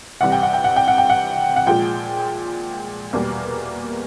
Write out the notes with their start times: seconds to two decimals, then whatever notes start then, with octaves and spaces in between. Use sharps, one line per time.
0.21 C2 C3 E3 G3 F#5
0.32 G5
0.43 F#5
0.53 G5
0.64 F#5
0.76 G5
0.88 F#5
0.98 G5
1.10 F#5
1.56 F#5
1.66 A#2 F3 G#3 G5
3.13 E2 B2 G3 A#3